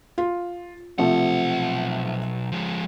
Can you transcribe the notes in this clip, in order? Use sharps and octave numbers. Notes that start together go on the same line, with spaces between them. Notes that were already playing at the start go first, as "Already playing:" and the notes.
F4
B1 C3 F3 A3 F#5
F3 G#3